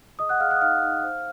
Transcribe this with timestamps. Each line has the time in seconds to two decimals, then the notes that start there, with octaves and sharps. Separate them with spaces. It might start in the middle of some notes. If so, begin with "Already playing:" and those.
0.19 G#4 D#5 D#6
0.29 F#5 F#6
0.40 G#4 F5 F6
0.50 F#5 F#6
0.56 D#6
0.61 D#4 F5 F6
0.82 D#4
1.03 C5